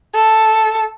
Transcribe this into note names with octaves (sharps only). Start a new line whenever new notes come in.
A4